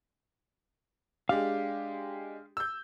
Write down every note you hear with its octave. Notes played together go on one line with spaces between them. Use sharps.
G#3 D4 G4 F5
E6 G6